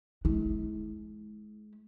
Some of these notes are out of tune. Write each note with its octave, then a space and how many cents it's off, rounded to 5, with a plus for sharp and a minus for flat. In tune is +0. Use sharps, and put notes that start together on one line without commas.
G#3 +35 E4 -30